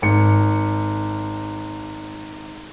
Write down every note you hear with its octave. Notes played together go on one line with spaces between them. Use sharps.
G#1 C#7